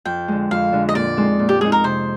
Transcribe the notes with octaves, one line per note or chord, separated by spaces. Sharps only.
F2 G5
D3 G#3
F2 F5
D3 G#3
D#5
A#2 D5
G#3 C4 D#4
A#2
G4
G#3 C4 D#4 G#4
A#4
C3 C5